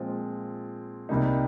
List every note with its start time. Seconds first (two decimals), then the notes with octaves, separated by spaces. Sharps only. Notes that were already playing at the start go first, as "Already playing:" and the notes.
Already playing: A#2 F3 G#3 C4 F4
1.09 C2 C3 G3 A#3 D#4